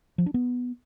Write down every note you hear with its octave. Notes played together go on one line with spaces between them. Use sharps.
F3
D4
B3